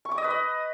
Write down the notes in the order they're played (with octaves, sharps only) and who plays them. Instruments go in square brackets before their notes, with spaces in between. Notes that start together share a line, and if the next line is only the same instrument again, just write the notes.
[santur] C#6
D6
D#5
B4
D#5